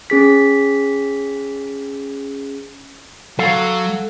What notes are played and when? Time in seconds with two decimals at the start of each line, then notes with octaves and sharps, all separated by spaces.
0.10 C#4 G#4 B6
3.39 F#3 A4 F5 F#5